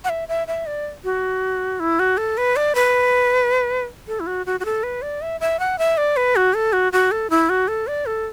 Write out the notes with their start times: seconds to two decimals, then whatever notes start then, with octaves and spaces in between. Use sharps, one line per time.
0.04 F#5
0.09 E5
0.28 E5
0.48 E5
0.66 D5
1.04 F#4
1.80 E4
1.99 F#4
2.18 A4
2.37 B4
2.56 D5
2.75 B4
4.08 A4
4.20 E4
4.27 F#4
4.46 F#4
4.60 F#4
4.65 A4
4.83 B4
5.02 D5
5.22 E5
5.41 E5
5.59 F#5
5.79 E5
5.97 D5
6.17 B4
6.36 F#4
6.54 A4
6.73 F#4
6.92 F#4
7.11 A4
7.30 E4
7.49 F#4
7.68 A4
7.87 D5
8.06 A4